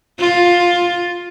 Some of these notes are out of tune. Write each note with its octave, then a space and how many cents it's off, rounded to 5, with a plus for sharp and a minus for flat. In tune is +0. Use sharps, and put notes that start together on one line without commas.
F4 +10